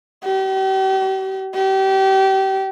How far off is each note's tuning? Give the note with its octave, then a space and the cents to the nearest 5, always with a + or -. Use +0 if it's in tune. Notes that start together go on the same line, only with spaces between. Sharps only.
G4 -40
G4 -30